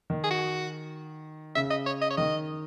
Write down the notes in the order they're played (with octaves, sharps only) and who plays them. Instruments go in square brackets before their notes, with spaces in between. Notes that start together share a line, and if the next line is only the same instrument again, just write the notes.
[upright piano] D#3
[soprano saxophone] G#4
F#4
[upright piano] C#3 [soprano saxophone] E5
[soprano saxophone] D#5
C#5
D#5
C#5
[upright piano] D#3 [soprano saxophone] D#5